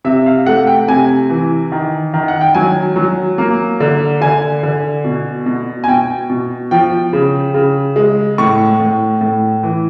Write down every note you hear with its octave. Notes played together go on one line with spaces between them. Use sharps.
C3 E5
F5
A3 F#5
G5
C3 G#5
E3
D#3
D#3
F#5
G5
F#3 G#5
F#3
A#3
D3
D3 G#5
D3
B2
B2
G#5
B2 G5
B2
F3 G5
C#3
C#3
G#3
A2 C#6
A2
A2
E3